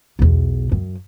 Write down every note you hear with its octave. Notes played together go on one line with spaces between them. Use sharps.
B1 E2
F#2